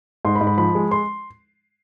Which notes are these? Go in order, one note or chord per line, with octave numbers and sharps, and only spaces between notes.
G#2 C6
B5
G#2
B5
F3 B5
G#3
C6